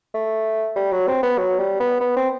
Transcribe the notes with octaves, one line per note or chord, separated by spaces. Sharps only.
A3
G3
F#3
C4
B3
F#3
G3
B3
B3
C4